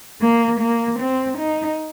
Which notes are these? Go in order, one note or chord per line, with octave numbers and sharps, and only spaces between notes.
A#3
A#3
C4
D#4